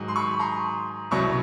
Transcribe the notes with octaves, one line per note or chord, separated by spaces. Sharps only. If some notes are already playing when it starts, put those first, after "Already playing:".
Already playing: G#2 D#3 F#3
C6
B5 C#6
A#5 C6
C2 B2 F#3 B5 C#6